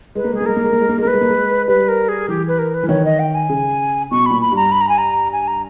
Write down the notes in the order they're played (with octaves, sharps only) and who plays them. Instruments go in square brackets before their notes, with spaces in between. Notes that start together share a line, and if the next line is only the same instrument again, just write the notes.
[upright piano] G#3 [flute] B4
[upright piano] A#3
[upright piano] G#3 [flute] G#4
[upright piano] A#3
[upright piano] G#3 [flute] A#4
[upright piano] A#3
G#3
A#3
G#3
A#3
G#3
[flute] A#4
[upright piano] A#3 [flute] B4
[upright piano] G#3
A#3
G#3
[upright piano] G3 [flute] B4
[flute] A#4
G#4
[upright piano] E3 [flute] G4
[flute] B4
A#4
B4
[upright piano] E3
[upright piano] D#3 [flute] C#5
[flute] D#5
G5
G#5
[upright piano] C#3
[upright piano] B2 [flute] C#6
[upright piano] A#2 [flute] B5
[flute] B5
[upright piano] G2 [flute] A#5
[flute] B5
A#5
G#5
A#5
G#5
A#5